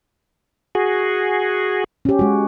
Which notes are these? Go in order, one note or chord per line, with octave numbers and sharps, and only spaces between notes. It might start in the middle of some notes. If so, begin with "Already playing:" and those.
F#4 G#4
C#4 G4
G#3 F#4